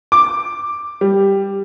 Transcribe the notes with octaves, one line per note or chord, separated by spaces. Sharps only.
D6
G3